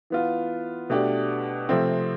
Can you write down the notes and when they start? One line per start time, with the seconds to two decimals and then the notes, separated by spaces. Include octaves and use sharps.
0.10 E3 B3 F4
0.90 B2 A3 D4 G4
1.69 C3 F3 A3 C4